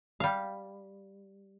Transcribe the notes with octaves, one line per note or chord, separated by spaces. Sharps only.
G3 F5